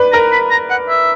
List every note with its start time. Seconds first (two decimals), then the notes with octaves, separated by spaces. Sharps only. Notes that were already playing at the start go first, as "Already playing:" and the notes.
Already playing: B4 D5
0.13 A#4 A#5
0.32 B5
0.51 A#5
0.70 F#5
0.89 E5